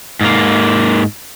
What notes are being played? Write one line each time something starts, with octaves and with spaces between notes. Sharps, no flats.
G#2 A#3